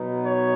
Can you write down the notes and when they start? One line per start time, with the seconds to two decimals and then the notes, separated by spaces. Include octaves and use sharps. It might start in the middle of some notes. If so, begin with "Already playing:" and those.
Already playing: B2 F#3 B3 D#4
0.24 C#5